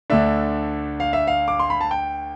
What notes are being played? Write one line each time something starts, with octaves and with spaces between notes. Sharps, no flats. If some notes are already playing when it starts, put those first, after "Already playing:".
D2 D3 A3 D4 E5
F5
E5
F5
D6
C6
B5
A5
G5